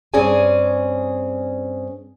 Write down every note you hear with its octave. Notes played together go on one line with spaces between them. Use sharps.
G2 C4 C#4 G#4 D5 G#5